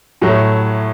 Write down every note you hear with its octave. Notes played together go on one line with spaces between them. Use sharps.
A2 F#3 A3